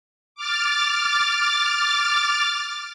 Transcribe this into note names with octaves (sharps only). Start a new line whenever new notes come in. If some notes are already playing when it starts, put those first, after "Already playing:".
D6 F6 A6